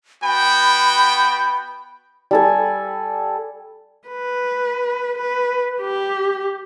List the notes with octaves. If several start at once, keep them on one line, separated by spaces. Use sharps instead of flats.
B3 F#4 G5 B5
G3 A4 G#5
B4
B4
G4